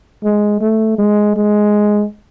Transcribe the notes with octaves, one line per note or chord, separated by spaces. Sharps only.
G#3
A3
G#3
G#3